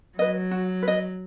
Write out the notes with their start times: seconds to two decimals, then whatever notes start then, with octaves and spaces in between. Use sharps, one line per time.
0.18 F#3 B4 D#5
0.51 F#4
0.83 B4
0.88 D#5